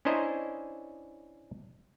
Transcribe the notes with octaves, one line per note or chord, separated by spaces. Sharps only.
C#4 D4 E4 C5 D#5 A#5